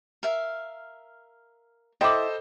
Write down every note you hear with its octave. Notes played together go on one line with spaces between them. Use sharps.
A#4 E5 F5
E4 A4 C5 D#5 G5 D6